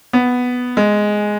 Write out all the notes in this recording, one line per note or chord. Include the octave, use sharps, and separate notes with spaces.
B3
G#3